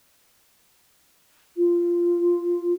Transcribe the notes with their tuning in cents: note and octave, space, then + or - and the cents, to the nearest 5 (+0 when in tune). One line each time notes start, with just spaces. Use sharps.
F4 -10